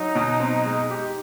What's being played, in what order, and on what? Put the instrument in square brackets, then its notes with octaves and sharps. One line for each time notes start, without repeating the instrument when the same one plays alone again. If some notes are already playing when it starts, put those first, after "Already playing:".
Already playing: [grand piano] F#3 [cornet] D#4
[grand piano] B2
C4
G#3
G4